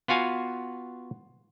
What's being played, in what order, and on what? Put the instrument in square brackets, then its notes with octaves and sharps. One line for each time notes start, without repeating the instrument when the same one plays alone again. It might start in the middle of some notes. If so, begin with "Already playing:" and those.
[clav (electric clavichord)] B3 F4 F#4 F5 G#5